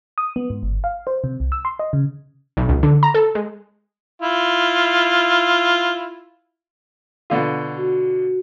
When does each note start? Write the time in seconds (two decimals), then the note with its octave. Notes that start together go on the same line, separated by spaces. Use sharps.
0.18 D#6
0.36 B3
0.50 G#2
0.63 G1
0.84 F5
1.07 C5
1.24 C3
1.40 C2
1.52 E6
1.65 C6
1.79 D#5
1.93 C#3
2.57 B1
2.69 C#2
2.83 D3
3.03 A#5
3.14 A4
3.35 G#3
4.22 E4 F4
7.30 B2 D3 F4
7.77 F#4